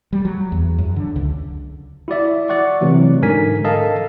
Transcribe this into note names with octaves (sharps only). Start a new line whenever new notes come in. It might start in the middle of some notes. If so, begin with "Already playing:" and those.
G3
F#3
E2
F#2
D3
C#2
E4 F#4 D5 E5
D5 F#5 C#6
C3 E3 F#3 A3
G#2 D3 A#4 G#5 B6
A4 A#4 D#5 F5 A5